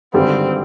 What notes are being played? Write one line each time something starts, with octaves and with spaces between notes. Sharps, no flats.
G#1 G2 D3 G3 C4